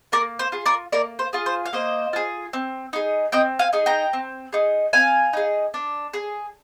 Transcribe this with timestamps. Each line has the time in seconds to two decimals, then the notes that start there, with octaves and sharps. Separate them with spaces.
0.12 A#3 A#4 D5
0.39 C5
0.52 F4 G#4
0.66 A#4 D5
0.92 A#3 A#4 D5
1.19 C5
1.33 F4 G#4
1.46 C5
1.66 F5
1.73 A#3 C5 D#5
2.13 F4 G#4
2.53 C4
2.93 D#4 G#4
3.32 C4 D#5 G5
3.59 F5 G#5
3.73 D#4 G#4
3.86 G5 A#5
4.13 C4
4.53 D#4 G#4
4.93 C4 F5 G#5
5.33 D#4 G#4
5.74 D4
6.13 G#4